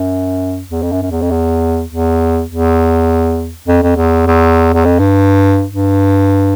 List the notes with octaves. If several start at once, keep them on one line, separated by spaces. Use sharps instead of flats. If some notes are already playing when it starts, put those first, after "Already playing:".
Already playing: F#2
E2
F2
F#2
F#2
E2
F2
E2
E2
E2
F2
F2
E2
E2
E2
F2
G2
G2